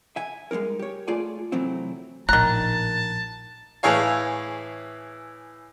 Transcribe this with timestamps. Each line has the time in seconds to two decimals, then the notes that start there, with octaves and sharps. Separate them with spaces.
0.16 E5 G#5
0.51 G3 G#3 C4 D#4 A#4
0.79 G4 C#5
1.07 A3 F4 G#4 D5 G#5
1.52 C3 E3 F#3 A3 C4 E4
2.29 A#1 A2 D#3 A5 A#5 F#6
3.83 A2 E3 G#4 C#5 F5